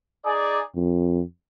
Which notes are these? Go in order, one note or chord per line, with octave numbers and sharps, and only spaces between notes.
D#4 G#4 D5
F2